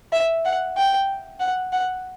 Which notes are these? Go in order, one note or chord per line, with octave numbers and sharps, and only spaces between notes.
E5
F#5
G5
F#5
F#5